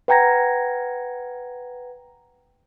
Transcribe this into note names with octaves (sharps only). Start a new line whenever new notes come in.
B4 F#5 G5 A#5 G#6 A#6